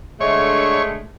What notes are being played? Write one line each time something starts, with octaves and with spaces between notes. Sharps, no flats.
D3 G#3 A3 C#5